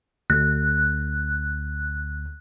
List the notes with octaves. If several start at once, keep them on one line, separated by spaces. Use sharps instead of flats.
D2 F#6